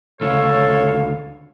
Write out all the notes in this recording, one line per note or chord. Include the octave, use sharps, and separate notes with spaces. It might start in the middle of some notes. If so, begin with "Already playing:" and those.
D2 C#3 A4 C#5 F5